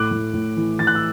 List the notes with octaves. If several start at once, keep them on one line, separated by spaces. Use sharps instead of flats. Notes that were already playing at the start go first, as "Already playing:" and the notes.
Already playing: A2 D6 F#6
A2
A2
E3
E3 A6
F#6
E6